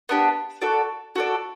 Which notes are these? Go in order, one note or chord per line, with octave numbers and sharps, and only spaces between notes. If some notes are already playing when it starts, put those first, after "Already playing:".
B3 D4 G4
F#4 A4 D5
F#4 A4 D5